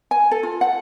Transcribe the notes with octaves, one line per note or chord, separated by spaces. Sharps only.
G#5
A4
F4
F#5